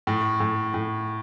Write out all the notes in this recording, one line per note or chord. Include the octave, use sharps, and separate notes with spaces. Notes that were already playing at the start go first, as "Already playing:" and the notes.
A2
A2
A2